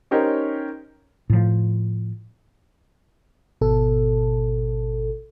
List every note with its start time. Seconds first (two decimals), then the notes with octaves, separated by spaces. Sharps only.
0.11 C#4 D#4 G4 A#4 C5 C#5
1.30 A2 F3
3.61 G#1 B2 A4